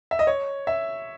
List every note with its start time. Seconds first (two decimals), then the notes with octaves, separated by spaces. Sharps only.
0.11 E5
0.19 D#5
0.27 C#5
0.67 E5